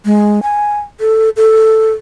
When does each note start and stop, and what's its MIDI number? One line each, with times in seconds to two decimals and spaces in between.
0.05 0.40 56
0.43 0.78 80
1.00 1.30 69
1.37 1.92 69